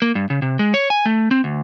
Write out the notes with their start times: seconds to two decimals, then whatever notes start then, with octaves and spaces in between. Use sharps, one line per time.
0.02 A#3
0.15 G2
0.30 C#3
0.42 C3
0.59 G#3
0.74 C#5
0.90 G#5
1.06 A3
1.31 C4
1.44 D2